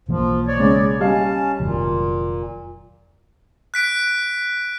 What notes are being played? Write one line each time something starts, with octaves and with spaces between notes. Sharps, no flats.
B1 E3 F3 A#3
C#5 D5
C#3 G#3
G3 C#4 D#5 F5 A5
F1 A#2 D#3 F#3
F#6 B6 D7